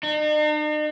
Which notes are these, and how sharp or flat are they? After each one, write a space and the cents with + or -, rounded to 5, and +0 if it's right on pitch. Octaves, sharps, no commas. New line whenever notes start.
D#4 -45